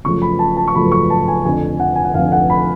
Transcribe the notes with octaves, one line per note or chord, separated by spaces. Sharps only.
F#2 C#3 F3 A3 C#6
B5
A5
A5
C#6
F#2 C#3 F3 A3 B5
C#6
A5
G#5
F1 F2 D3 G#5
F#5
G#5
F#5
F1 F2 D3 F5
F#5
B5